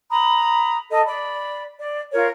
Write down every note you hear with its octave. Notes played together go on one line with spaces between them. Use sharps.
A#5 B5 D#6
A4 D#5
D5 B5
D5
F4 A#4 C#5